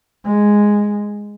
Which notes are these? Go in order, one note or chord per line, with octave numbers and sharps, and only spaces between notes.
G#3